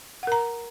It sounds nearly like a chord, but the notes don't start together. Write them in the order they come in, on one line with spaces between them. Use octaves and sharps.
F#5 A#4 A#5